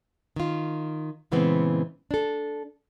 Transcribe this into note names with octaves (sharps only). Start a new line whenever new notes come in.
D#3 F4
A#2 C#3 E3 G#3 B3 C4
D4 A4